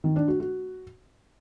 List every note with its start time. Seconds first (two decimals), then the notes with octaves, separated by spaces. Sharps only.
0.04 D#3
0.16 D4
0.28 F#4
0.40 F#4